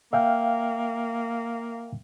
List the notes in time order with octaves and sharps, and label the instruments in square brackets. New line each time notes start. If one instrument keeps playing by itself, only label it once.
[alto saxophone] A#3 [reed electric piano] E5 F5 G5